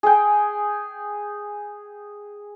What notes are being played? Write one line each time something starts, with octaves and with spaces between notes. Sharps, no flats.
G#4 G5